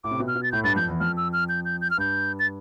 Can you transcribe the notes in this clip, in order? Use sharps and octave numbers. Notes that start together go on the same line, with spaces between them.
A2 D6
C3
B2
F6
B2
A6
A2 G6
G2 A6
F2 G6
E2
F2 F6
E6
F6
G6
G6
G6
F6
G2 G6
A6